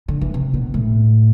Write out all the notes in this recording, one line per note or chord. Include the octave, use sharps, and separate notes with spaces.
D3
E3
C3
B2
A2